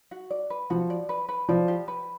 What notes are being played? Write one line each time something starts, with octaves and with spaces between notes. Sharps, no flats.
F#4
D5
B4
F3 F#4
D5
B4
B4
F3 D5
G4
B4